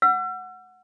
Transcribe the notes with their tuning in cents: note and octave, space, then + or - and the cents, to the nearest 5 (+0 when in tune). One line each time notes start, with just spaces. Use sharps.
F#5 -5 E6 +45